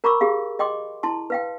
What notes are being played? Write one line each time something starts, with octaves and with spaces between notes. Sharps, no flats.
A#4 A#5 B5 C#6 D6 E6
G4 G#4 F5
D#5 G5 C6 D6
E4 A5 C6
B4 F5 G5